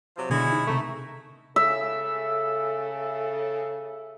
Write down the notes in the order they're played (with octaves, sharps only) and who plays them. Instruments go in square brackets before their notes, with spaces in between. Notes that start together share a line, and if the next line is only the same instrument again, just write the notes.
[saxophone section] C3 F3 F#3
[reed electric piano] B2 D3 [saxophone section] G#3 C#4 E4
[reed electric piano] D#4
[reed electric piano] C3 C#6 [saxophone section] D#3 A3
[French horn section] C#3 A4 [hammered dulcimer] E5